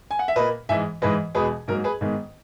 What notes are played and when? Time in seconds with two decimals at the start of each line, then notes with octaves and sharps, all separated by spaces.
0.11 G#5
0.19 F#5
0.28 E5
0.36 A#2 A#3 B4 D#5
0.69 G#2 E3 G#3 E5 G#5
1.02 G#2 E3 G#3 B4 D#5
1.35 E2 B2 G#3 G#4 B4
1.68 G#2 F#3 A#3 A#4
1.84 G#4 B4
2.01 G#2 D#3 G#3 B3